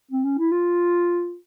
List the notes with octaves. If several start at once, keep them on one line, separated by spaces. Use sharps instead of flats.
C4
C#4
E4
F4